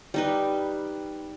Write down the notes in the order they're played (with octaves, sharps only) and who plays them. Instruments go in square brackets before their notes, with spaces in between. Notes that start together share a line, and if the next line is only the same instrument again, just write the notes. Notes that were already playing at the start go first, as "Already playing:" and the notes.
[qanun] G3 D#4 B4